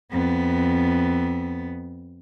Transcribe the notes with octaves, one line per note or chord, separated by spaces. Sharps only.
F2 B3